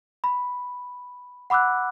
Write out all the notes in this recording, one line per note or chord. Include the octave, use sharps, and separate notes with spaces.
B5
F#5 B5 D6 E6 F#6